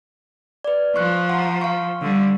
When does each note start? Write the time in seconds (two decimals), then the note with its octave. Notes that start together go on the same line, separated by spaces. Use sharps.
0.64 B4 D5
0.96 F3 C#6 F#6
1.30 F#5 A#5
1.61 F5 C#6
2.02 D3 G3